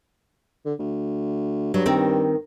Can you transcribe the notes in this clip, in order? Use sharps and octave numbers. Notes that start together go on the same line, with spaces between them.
D3
D2
G2 F#3
D#3 C4 A#4